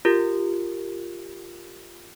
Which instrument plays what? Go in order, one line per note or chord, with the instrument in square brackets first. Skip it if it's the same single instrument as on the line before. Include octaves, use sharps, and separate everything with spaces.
[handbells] F4 G4 A#4